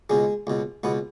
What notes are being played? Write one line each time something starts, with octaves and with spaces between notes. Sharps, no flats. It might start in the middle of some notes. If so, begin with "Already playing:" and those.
C#2 B2 G#3
C#2 B2
C#2 B2 B3